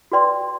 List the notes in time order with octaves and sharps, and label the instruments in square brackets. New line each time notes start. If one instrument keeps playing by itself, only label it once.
[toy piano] F#4 B4 D5 G5 C6